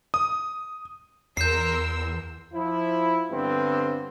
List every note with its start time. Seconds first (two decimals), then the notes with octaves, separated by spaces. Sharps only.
0.14 D#6
1.37 E2 A#4 C6 E6 G6 C7
2.53 F3 E4
3.31 G2 D3 B3 C4